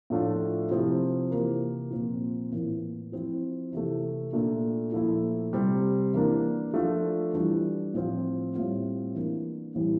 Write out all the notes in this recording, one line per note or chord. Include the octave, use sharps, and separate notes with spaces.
A2 F3 A3 D4 F4
C3 F3 C4 E4
C3 E3 A#3
A#2 F3 C4 F4
A2 E3 A#3
F3 C4 E4
C3 E3 A3
A#2 A3 D4
A#2 F3 A3 E4
C3 G3 C4
E3 A#3 D4
F3 A3 D4 F4
E3 G3 D4
A2 F3 C4 F4
A2 G3 C4 F4
E3 A#3 D4
A2 E3 G3 C4 E4